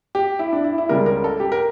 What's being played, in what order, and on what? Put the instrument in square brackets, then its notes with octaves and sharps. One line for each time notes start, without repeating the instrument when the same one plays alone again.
[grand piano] G4
E4
D4
E4
E4
C#2 C#3 G3 A#4
A#4
A4
G4
A#4